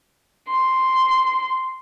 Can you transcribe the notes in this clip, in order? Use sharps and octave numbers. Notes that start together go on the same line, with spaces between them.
C6